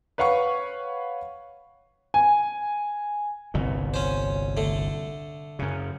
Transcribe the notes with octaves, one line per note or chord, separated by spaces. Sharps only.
B4 C#5 F5 F#5 C#6
G#5
G1 C2 A#2
C#4 C5
D3 A3
F#2 C#3